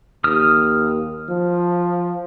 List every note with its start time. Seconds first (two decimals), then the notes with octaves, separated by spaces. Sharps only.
0.24 D#2 D#6 F6
1.29 F3